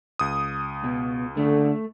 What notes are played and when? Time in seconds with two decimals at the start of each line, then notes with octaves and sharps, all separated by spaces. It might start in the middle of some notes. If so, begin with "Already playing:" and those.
0.19 C#2 D#6
0.84 B2
1.37 D3 A3